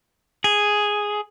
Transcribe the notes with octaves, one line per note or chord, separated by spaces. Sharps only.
G#4